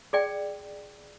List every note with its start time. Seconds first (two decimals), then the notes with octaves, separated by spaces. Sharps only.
0.13 G#4 D5 G5